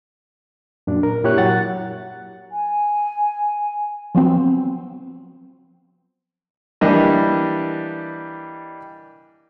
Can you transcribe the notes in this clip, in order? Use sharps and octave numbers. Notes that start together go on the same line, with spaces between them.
F#2 A#2 D4
A#4
A#2 E4 G4 C#5 F#6
F#3 F#5 A6
G#5
F3 F#3 B3 C4
E3 G3 A#3 D4 D#5